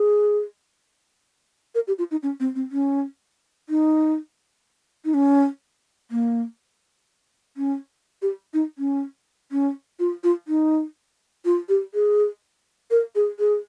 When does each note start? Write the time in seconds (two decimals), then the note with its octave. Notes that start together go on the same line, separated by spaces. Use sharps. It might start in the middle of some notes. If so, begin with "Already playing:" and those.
Already playing: G#4
1.75 A#4
1.87 G4
1.99 F4
2.11 D#4
2.23 C#4
2.40 C4
2.55 C4
2.72 C#4
3.69 D#4
5.05 D#4
5.14 C#4
6.11 A#3
7.57 C#4
8.22 G4
8.54 D#4
8.78 C#4
9.52 C#4
10.00 F4
10.24 F4
10.48 D#4
11.45 F4
11.69 G4
11.94 G#4
12.91 A#4
13.15 G#4
13.39 G#4